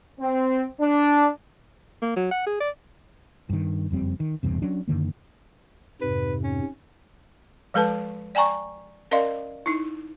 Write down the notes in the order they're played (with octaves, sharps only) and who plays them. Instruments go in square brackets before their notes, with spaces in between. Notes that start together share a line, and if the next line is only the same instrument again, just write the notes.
[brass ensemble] C4
D4
[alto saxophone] A#3
F#3
F#5
G#4
D5
[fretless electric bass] G2 D#3
F#1 F2 G3 C4
D#3
F#1 E2 G2 C3
F#3 C#4 D4
F#2 D3 D#3 A#3
[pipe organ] F2 G#2 C3 [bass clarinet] B4
[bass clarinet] C#4
[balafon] F3 G#3 A4 B4 A5
D5 G5 G#5 A#5 C#6
C#4 A#4 D5 D#5 F5 C6
D#4 E4